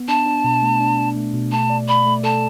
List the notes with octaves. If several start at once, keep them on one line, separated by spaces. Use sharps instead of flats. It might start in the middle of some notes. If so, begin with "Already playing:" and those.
Already playing: B3
D4 A5
D4
B2
A3
D4
D4
A3
B2
A3 A5
D5
D5 B5
A3
A4 A5